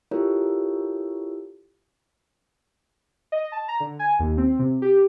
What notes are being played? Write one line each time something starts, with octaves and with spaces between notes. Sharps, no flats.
E4 F4 G4 A4 A#4 C#5
D#5
A5
A#5
D3
G#5
D#2
C4
C3
G4